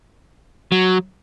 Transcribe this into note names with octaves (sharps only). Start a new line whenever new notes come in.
F#3